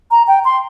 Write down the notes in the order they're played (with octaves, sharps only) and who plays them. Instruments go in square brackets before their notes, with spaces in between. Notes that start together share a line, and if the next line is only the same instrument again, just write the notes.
[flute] A#5
G5
C6